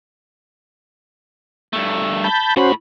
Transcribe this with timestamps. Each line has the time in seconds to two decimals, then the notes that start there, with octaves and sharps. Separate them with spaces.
1.73 G2 A3
2.24 A5 B5 G6
2.57 A2 C#4 F#4 C5 B5